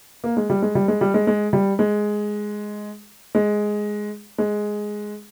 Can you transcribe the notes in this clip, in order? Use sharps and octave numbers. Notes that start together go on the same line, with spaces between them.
A#3
G#3
G3
G#3
G3
G#3
G3
G#3
G#3
G3
G#3
G#3
G#3